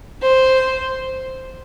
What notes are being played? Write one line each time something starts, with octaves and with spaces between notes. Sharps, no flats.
C5